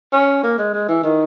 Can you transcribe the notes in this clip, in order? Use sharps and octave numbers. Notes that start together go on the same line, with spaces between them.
C#4
A#3
G#3
G#3
E3
D#3